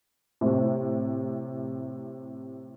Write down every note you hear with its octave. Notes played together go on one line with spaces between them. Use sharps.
A2 C3